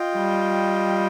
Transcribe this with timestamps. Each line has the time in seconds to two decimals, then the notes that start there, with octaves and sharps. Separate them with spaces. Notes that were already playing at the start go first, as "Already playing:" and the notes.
Already playing: F4 D#5 G5
0.16 G3